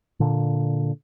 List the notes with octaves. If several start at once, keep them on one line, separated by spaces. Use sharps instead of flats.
A#2 D3